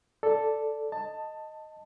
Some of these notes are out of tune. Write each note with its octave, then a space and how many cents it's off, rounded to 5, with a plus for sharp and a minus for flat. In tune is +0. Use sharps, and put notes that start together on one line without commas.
A4 +0 D5 -5
D#5 +0 A5 +15